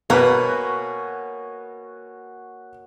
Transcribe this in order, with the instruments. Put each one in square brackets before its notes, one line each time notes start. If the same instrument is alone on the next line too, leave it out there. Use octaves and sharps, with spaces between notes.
[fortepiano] B2 B4 [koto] A#3 [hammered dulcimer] F#4 C#5 G#5